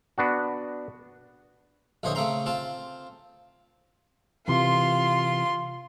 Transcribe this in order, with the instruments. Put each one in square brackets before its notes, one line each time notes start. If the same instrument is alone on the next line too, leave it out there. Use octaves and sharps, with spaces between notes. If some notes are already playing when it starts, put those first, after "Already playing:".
[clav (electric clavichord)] B3 D4 F#4
[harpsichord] A#1 D3 E3 C5 C#5 D#5
C#3 A3 C4 A#5 C6
C4 F4 A5
[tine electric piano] C3 E3 [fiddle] F4 C6